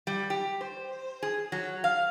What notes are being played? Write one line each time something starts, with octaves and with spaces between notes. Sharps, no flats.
G3
G4
C5
G#4
F#3
F5